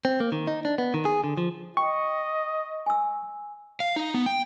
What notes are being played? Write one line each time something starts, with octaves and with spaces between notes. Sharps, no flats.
C4
A#3
D#3
D#4
D4
B3
D#3
G#4
D3
F3
D#5 G5 C#6
G#5 E6
F5
D#4
B3
G5